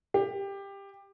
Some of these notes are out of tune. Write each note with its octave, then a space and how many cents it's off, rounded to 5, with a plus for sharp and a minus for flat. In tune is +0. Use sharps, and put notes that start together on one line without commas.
G4 +15